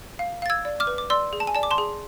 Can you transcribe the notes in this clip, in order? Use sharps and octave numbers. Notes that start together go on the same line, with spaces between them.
F5
F5 A6
E6 G#6
D5
D6 F6
B4
D6
D5 C6 E6
G#4
A5
G#5
D5 A5
D6
A5 C6
G#4